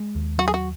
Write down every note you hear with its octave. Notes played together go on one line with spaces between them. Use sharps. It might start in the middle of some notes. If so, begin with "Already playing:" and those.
Already playing: G#3
D#2
F#3 F#4
G#4
F#4